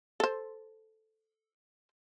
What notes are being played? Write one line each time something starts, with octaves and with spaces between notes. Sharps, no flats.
A4 C5